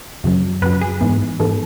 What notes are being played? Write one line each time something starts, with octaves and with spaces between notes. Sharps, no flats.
F#2 C#3 F#3
F#2 C#3 F#3 B4
G#4
G#2 E3 B3
G#2 E3 B3 A4